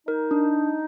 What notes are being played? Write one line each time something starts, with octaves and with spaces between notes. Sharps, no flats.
D#4 A#4
D4